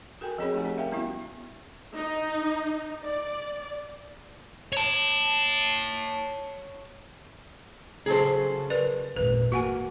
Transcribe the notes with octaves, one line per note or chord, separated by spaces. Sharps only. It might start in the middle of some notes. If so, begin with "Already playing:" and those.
F#4 A4 A#4 G5 G#5
F3 C4 C#4 G#4 C#5 B5
A3 D#4 G4 F#5 G#5
C#4 A4
A#4 E5 F5 G5
G3 B3 C#4 E4 F#4
D#4
D5
C#5 A5
C#3 F#3 G#4 A4 C5
A#4 B4 D5
G#1 E2 A#2 B4
A#3 F#4 F#5 G#5